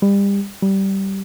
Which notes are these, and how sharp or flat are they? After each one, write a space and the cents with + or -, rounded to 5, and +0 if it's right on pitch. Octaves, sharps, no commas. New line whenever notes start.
G3 +30
G3 -15